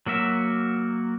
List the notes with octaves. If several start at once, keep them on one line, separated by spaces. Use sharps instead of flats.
F#3 A#3 F#4 E5